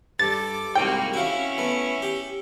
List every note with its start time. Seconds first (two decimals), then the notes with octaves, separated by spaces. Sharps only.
0.19 G2 A4 D6 A6
0.75 C2 G#2 A#3 F#4 G5
1.13 C#4 E4 F#4 F5
1.58 A3 B3
2.02 G4